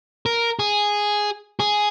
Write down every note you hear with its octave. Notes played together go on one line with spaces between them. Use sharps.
A#4
G#4
G#4